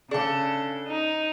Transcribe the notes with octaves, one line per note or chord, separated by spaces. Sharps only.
C#3 D4 G#4 A4
D#4